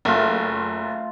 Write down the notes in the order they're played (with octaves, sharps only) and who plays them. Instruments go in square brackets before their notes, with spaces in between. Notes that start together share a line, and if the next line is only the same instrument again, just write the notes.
[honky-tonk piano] F#1 [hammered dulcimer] A3 F4